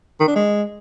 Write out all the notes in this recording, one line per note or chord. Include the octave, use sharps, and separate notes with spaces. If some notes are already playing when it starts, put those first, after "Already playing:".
D#3
D4
G#3